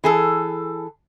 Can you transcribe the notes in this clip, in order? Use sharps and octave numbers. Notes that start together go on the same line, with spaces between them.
E3 G#4 A4